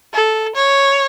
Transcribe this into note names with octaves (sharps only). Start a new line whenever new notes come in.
A4
C#5